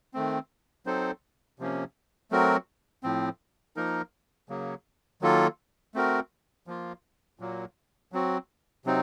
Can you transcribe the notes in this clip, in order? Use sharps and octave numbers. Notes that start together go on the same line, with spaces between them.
D#3 A3 C4
F#3 C4 D#4 A4 C5
C3 F3 A#3 C#4
F#3 A3 C4 F#4 A#4
A2 F3 C4
F3 A#3 D#4 A#4
C#3 F#3 A#3
D#3 F#3 A#3 F4 A4
A3 C4 F#4 A#4
F3 A#3 F4
A#2 F#3 A#3
F#3 C4 F#4
C3 F#3 C4 D#4